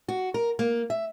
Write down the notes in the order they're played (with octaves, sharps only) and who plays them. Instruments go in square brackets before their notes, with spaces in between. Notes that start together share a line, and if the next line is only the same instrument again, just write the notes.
[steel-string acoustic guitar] F#4
A#4
A#3
E5